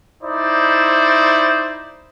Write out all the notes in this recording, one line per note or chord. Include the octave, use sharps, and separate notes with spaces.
D#4 E4 C5 D5